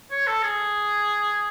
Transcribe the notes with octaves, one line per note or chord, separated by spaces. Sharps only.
C#5
A4
G#4